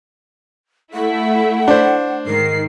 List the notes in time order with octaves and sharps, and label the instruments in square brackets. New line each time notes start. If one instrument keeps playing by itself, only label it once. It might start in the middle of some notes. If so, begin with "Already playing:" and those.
[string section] A3 E4 [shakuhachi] F#5
[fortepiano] D4 C5
[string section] G#2 D#3 C7 [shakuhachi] A#4